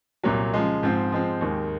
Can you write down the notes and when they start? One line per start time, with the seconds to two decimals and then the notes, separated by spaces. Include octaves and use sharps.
0.23 C2 A#2 F#3
0.54 C#3 F3 G#3
0.83 G#2 F3 C4
1.12 F3 G#3 C4
1.41 D#2 D#3 G#3